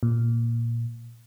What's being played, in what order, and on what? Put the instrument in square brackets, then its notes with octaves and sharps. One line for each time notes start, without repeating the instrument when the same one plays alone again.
[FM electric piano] A#2